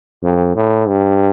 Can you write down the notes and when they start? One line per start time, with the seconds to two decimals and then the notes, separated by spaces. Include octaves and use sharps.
0.23 F2
0.55 A2
0.88 G2